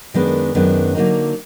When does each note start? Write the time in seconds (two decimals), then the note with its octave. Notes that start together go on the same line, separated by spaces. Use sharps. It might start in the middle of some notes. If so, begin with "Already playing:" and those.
0.14 F#2 D#3 G#3 B3 D4
0.55 F#2 D#3 G#3 B3 D4
0.95 D3 F#3 A#3 D#4